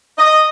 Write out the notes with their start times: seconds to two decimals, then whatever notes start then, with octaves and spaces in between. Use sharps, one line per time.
0.19 D#5